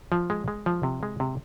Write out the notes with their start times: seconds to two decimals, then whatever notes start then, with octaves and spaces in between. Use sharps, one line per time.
0.12 F3
0.30 G#3
0.48 G#3
0.66 F3
0.83 C3
1.03 G#3
1.20 C3